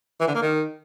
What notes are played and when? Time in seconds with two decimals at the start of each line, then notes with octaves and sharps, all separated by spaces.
0.20 E3
0.28 D3
0.35 A#3
0.42 D#3